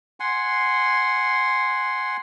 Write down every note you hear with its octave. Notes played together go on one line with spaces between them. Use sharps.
F#5 G#5 C6